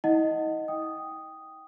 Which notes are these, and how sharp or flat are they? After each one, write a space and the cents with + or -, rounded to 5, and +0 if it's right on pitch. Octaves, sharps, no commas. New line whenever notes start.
E4 -45 D#5 +0 F#5 +0
G5 +0 D#6 +0